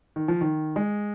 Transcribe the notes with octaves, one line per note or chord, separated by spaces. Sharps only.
D#3
F3
D#3
G#3